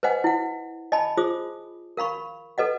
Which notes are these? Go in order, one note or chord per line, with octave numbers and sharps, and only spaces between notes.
B4 C5 D#5 F#5 G#5
E4 F#5
D#5 G#5 A5 B5
F4 G#4 C5 D#6
A#4 F5 B5 C#6
A4 B4 D#5 F#5